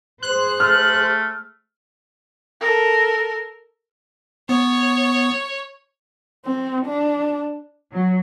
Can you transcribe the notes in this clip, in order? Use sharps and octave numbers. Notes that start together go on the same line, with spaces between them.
G#4 C5 F#6
A3 F6
A4 A#4
B3 C#5
C4
D4
F#3